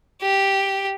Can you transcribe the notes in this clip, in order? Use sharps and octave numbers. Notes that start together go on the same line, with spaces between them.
G4